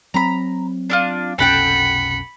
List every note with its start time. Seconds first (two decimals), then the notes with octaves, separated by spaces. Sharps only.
0.14 F#3 C4 A#5 B5
0.90 D4 E4 F4
1.39 F1 B1 C#4 A4 F#5 G5 B5 C#7